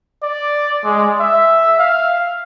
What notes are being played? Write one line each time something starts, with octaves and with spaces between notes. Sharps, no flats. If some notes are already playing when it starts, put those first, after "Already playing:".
D5
G#3
E5
F5